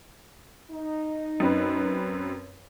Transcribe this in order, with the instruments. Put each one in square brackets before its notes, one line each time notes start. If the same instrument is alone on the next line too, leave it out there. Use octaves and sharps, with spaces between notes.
[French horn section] D#4
[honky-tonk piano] F#2 C4 B4